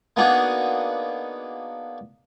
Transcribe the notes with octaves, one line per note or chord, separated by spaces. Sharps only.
A#3 B3 D4 D#4 F#4 G#4